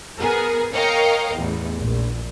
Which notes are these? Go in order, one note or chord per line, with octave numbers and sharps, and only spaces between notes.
B3 G#4 A#4
A#4 C#5 D#5 F5 G5 A#5
A1 E2
A#1